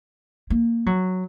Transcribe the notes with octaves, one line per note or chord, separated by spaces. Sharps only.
A#3
F#3